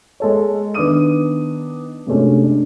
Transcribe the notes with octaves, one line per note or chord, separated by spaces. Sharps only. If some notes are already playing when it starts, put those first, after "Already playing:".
G#3 A4 C#5
D#3 B3 D4 D6 D#6 D#7
F#2 C3 G#3 A3 C#4 D4
D4